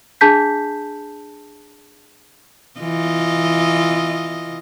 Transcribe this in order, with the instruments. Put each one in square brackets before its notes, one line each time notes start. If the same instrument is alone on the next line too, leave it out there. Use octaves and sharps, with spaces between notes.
[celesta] D4 G#4 A5 G6 B6
[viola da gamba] E3 F4 D#5